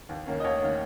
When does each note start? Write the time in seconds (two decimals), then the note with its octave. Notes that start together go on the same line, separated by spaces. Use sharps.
0.09 D#2
0.26 D#3 A#3 C#4
0.40 D#5
0.44 D#2 C#5
0.62 D#3 A#3 C#4